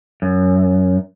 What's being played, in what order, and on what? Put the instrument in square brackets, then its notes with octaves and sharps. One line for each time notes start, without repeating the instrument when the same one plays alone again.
[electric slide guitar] F#2